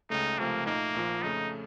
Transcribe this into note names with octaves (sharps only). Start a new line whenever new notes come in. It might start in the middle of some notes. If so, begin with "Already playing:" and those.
C#2 C#3 A3 D#4
C#2 C3 F3 A3 A#3
A#2 A3 A#3 D#4
A#1 A#2 F3
F2 C#3 A3 D#4